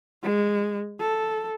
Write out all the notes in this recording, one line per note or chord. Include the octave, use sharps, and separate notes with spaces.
G#3
A4